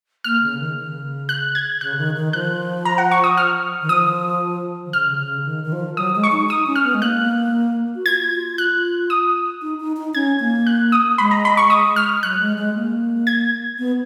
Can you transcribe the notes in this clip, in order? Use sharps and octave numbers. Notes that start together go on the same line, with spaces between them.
A#3 F6
C#3
D#3
C#3
F#6
G#6
C#3 F#6
D#3
D#3
F3 F#6
A#5
F#5
C#6
D#6
F6
D#3
F3 D#6
D#3
C#3 F6
C#3
D#3
D#3
F3
F#3 D#6
G#3
C#6
D#4
D#4 D#6
C#4
F6
B3
G#3
A#3 F#6
F#4
F4 G#6
F4
F4 F#6
D#6
D#4
D#4
D#4
C#4 G#6
A#3
F#6
D#6
G#3 B5
A#5
B5
C#6
D#6
F6
F#3 F#6
G#3
G#3
A#3
G#6
B3